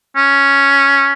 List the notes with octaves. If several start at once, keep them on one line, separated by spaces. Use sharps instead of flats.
C#4